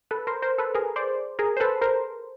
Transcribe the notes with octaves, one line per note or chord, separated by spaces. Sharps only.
A4 B4
A#4 C5
A#4 C5
A4 B4
G#4 A#4
C5 D5
G#4 A#4
C5
A4 B4
A#4 C5